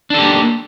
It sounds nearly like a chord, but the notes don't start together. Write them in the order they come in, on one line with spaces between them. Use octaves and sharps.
D4 A4 G4 A#3